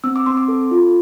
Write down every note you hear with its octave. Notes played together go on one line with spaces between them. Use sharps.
C4 E6
D6
C4 C6
D6
A4
F4